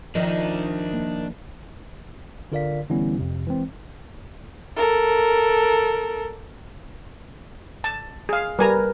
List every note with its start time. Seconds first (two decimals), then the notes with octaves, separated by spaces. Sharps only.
0.15 D#3 F3 D4 D5 E5
0.93 A#3
2.52 D3 F4 A#4 D5 F5 B6
2.90 D3 E3 G3 B3 C#4 E4
3.17 F2 C3
3.47 E3 G#3 C4
4.76 A4 A#4
7.84 A5
8.29 G#4 F5
8.59 G3 A#4 B4 G#5 A#5